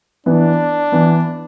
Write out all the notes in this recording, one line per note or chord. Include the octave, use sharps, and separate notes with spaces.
E3 B3 D4 E4
E3 B3 E4